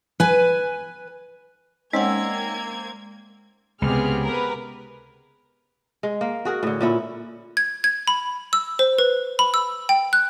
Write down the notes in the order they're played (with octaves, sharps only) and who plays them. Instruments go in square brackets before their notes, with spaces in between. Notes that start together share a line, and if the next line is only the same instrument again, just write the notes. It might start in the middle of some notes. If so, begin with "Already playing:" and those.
[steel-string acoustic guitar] B4 G#5
[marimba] G#3 F#5 [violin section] A#3 G#6 [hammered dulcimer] C4 D5 [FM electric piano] C#4 D#4
[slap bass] C#2 [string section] C3 F6 [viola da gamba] B3 G4 G#4
[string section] A#4 B4
[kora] G#3
A#3
F#4 G#4 A#4
A2 D3
A#2 C#4 E4
[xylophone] G#6
G#6
B5
E6
C5
B4
B5
E6
G5
F#6